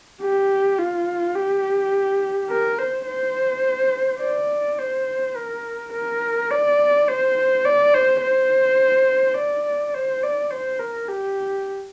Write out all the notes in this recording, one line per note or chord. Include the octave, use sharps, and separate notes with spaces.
G4
F4
G4
A#4
C5
C5
D5
C5
A#4
A#4
D5
C5
D5
C5
C5
D5
C5
D5
C5
A#4
G4